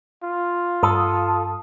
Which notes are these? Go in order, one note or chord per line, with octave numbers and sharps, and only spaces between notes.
F4
G2 A4 D#6